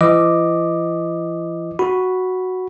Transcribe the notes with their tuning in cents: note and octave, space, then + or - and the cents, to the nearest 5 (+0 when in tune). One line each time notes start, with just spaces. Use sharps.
E3 +40 D#5 +0 D6 +0
F#4 +0 B5 +0